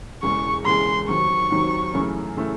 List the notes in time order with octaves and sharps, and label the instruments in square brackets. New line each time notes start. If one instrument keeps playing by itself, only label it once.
[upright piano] E1 E2 C#3 E3 G#3 [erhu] C#6
[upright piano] E1 E2 C#3 E3 G#3 [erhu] C6
[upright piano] D#2 D#3 F#3 C4 [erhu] C#6
[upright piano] D#2 D#3 F#3 C4
F#2 C#3 E3 A3
C#3 E3 A3